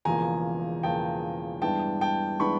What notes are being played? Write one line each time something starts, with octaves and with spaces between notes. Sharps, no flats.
E1 E2 C#3 F3 A#3 G#5 A#5
E1 E2 C#3 F3 A#3 G5 A5
G2 E3 G#3 B3 D4 G5 A5
G5 A5
E3 G#3 B3 D4 B5 C#6